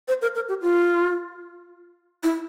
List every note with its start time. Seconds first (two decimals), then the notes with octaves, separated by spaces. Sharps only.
0.08 C5
0.22 A#4
0.35 A#4
0.49 G4
0.62 F4
2.23 E4